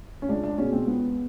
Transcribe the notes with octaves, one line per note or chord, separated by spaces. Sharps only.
C#4
C#2 D4
D4
B2 G#3 C#4
C4
C#2 B3